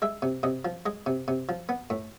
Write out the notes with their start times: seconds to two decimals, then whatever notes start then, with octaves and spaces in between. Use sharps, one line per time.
0.02 G#3 E5
0.22 C3
0.43 C3 D#5
0.65 F3
0.86 G#3 D#5
1.06 C3
1.28 C3
1.49 F3
1.69 B3
1.90 A2